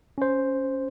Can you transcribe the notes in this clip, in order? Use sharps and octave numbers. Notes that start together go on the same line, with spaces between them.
C#4 C5